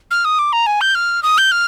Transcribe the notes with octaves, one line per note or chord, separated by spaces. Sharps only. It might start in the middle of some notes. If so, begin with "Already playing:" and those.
F6
D#6
D6
A#5
G#5
G6
F6
D#6
G6
F6